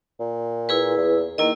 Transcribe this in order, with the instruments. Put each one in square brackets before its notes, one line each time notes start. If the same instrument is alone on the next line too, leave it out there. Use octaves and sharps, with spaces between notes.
[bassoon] A#2
[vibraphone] E4 G#4 B4
[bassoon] E2
[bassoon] D#3 [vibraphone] A#3 E4 D#5